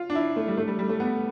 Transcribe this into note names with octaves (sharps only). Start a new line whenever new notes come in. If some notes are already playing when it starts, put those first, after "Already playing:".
Already playing: F4
D4
E4
A3
G3
A3
G3
G3
A3
B3